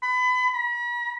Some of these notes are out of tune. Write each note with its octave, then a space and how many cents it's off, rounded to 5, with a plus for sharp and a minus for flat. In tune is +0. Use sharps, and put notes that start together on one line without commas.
B5 +30
B5 -45